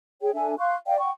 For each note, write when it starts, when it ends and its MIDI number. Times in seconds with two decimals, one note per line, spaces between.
0.21 0.32 68
0.21 0.32 73
0.21 0.32 79
0.34 0.55 62
0.34 0.55 69
0.34 0.55 76
0.34 0.55 80
0.59 0.75 77
0.59 0.75 84
0.59 0.75 85
0.59 0.75 90
0.86 0.97 74
0.86 0.97 75
0.86 0.97 77
0.86 0.97 79
0.98 1.11 78
0.98 1.11 79
0.98 1.11 85